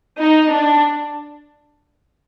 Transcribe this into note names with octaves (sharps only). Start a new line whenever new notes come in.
D#4
D4